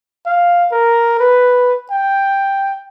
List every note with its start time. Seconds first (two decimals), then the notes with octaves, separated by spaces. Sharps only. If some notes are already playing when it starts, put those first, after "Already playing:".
0.26 F5
0.72 A#4
1.19 B4
1.91 G5